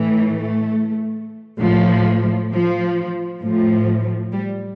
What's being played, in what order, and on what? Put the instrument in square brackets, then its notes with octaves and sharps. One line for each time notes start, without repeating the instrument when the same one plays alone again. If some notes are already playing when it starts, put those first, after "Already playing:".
Already playing: [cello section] A2 E3
A3
A2 F3
F3
A2 F3
G3